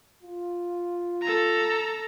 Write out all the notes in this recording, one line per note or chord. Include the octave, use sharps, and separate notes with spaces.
F4
A4 A#5